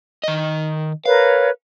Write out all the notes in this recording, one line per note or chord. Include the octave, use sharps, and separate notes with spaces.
D#3 D#5
A#4 B4 C#5 F5